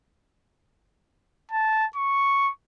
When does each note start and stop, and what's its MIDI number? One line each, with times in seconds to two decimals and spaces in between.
1.52 1.86 81
1.96 2.51 85